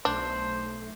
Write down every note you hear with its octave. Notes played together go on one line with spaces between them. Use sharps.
B1 A3 D4 C5